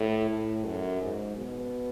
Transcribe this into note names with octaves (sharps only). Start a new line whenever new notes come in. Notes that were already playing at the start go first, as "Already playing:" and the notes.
Already playing: A2
A2
F#2
G#2
B2